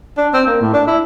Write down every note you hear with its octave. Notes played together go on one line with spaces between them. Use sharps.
D4
C4
A#3
A2
D4
E4